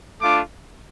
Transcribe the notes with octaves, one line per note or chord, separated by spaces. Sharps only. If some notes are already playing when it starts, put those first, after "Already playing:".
A3 D4 F4 D6